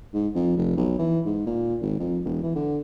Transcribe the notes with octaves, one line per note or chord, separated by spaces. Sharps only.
G#2
F2
F1
B1
E3
G#2
A#2
G#1
F2
E1
E3
D3